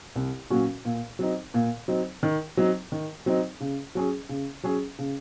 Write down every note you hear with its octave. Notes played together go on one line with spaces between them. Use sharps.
C2
A#2 F#3 C#4 F#4
A#2
F#3 C4 D#4
A#2
F#3 C4 D#4
D#3
F#3 C4 D#4
D#3
F#3 C4 D#4
C#3
F#3 C#4 G#4
C#3
F#3 C#4 G#4
C#3